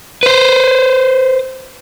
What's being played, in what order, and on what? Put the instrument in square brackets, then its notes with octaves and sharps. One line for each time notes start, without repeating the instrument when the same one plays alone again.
[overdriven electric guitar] B4 C5